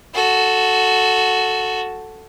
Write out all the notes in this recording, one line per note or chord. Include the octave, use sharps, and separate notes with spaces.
F#4 A4